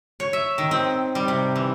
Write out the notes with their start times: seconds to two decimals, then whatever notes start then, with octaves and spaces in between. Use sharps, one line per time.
0.20 C#5
0.33 E5
0.58 D#3
0.71 C4
1.15 G3
1.28 C3
1.56 E3